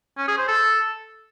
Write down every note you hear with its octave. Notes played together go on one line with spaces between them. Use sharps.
C#4
G#4
C5
A4